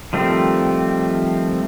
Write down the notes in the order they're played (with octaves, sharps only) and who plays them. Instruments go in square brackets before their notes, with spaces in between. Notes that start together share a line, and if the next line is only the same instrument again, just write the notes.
[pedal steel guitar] D#3 F3 G3 A3 C4